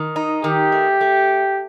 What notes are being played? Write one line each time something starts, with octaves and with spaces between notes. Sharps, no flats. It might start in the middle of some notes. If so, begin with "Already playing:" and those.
Already playing: D#3
D#4
D#3 G4
A3
A3